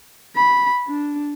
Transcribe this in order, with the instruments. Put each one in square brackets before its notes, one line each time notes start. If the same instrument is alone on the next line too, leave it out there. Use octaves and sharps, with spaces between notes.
[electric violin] B5
D4